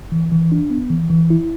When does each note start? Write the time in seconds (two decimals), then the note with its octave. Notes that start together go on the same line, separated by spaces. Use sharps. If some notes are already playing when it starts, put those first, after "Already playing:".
0.12 E3
0.32 E3
0.52 D4
0.70 B3
0.90 E3
1.10 E3
1.30 E4